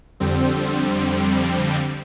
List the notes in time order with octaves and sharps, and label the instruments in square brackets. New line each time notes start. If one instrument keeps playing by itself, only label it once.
[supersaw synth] F2 D3 G3 C4